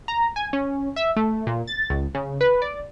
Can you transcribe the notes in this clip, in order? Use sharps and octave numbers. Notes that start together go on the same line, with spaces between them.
A#5
G#5
C#4
E5
A3
A#2
A6
C#2
C#3
B4
D5